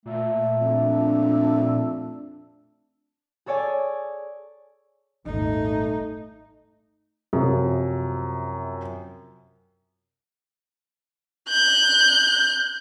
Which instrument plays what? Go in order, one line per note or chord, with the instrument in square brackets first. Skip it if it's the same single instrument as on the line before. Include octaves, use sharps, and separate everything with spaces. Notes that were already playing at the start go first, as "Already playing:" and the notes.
[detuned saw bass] A#2 [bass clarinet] A3
[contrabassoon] F2 [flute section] D4
[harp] G#4 A4 C#5 D5 G#5
[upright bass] D#1 G#1 [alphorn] A3 [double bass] D#4
[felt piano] F#2 C3 F3
[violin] F#6 G6